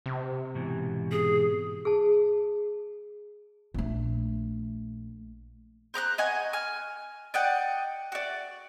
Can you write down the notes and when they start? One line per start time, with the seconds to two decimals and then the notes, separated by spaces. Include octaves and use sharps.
0.06 C3
0.54 G#2 B2 E3
1.11 G#4
1.85 G#4 A5
3.74 A#1 A3
5.94 C5 A#5 D6 F#6
6.18 D#5 F#5 G#5 C#6
6.53 G#5 F6
7.34 D5 D#5 F#5 G5
8.12 F#4 D5